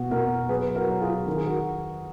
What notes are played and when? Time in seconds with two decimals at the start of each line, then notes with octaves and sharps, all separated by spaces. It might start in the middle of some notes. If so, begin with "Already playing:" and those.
Already playing: B2 F#4
0.11 B2 F#4 A#4
0.49 F#3 G#4 B4
0.75 F#4 A#4
0.88 F#3
1.01 F4 G#4
1.26 D#3 A#4
1.36 G#4
1.46 F#4 A#4